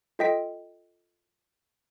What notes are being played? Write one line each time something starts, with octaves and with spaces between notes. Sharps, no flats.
F4 A4 D#5 G5 B6 D7